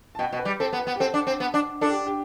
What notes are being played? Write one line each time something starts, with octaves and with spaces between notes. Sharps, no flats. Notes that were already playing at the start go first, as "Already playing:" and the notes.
A5
B2 G5
B2
B4
G3
C4 A4
B3
B4
B3
G4
C4 A4
D4
C4
B3
D4
D4 A4
G4
G4